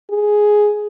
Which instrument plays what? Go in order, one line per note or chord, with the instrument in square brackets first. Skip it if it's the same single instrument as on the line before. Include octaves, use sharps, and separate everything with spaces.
[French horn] G#4